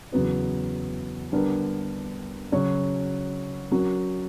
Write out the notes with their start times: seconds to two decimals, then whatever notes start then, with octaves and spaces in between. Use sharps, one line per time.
0.12 E2 C#3 F#3 B3 F#4
1.32 D3 G3 B3 D4 A#4
2.52 C#3 F#3 C#4 F#4 C#5
3.71 F#3 C#4 F#4 A#4